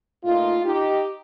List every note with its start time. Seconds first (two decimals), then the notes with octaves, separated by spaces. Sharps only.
0.24 A#2 A3 D#4 F4
0.64 D#4 G4